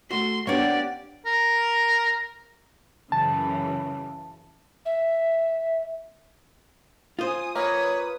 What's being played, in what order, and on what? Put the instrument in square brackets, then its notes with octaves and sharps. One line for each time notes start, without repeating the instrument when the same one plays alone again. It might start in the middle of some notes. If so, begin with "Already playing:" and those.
[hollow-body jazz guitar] A3 F#4 [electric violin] C6
[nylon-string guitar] A#3 B3 F#5 [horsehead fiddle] D4 G4 [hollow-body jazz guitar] C#5 [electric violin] D5
[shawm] A#4
[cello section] F#2 C#3 E3 [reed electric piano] A5
[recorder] E5
[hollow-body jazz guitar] F4 C5 [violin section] G#5 D#6
[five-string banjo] A#3 [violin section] B4 D#6 [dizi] C#5